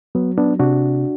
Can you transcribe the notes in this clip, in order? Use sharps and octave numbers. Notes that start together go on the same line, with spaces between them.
F#3 B3
B3 D4
C3 D4 F#4